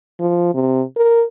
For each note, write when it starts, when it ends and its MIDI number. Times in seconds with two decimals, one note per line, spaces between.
0.20 0.50 53
0.55 0.82 48
0.96 1.24 70